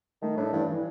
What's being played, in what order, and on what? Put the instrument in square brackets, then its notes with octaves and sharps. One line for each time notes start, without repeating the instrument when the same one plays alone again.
[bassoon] D#3 [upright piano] A3
[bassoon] A2 [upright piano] D4
[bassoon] G2 [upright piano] E3
[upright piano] E3